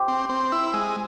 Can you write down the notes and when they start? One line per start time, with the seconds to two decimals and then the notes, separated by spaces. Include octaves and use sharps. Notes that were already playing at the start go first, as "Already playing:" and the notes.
Already playing: G4 C5
0.08 C4
0.29 C4
0.52 E4
0.73 G#3